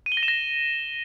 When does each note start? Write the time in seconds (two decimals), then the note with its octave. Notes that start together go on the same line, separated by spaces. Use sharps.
0.06 D#7
0.12 G7
0.17 A#6
0.23 E7
0.28 A#6